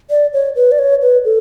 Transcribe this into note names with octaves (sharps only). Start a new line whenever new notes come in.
D5
C#5
B4
D5
C#5
B4
A4